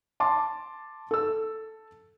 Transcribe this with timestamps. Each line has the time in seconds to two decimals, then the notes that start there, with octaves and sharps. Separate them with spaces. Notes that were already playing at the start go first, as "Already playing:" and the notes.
0.20 A5 C6 D6
1.11 A4 E6